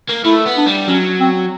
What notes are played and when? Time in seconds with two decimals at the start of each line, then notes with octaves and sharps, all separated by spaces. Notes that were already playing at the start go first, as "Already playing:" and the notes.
0.09 A#3
0.25 A3 E4
0.46 B3
0.57 D4
0.67 G3
0.88 F#3 C#4
1.20 C4